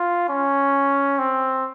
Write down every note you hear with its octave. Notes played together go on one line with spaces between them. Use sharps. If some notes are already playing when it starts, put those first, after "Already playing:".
Already playing: F4
C#4
C4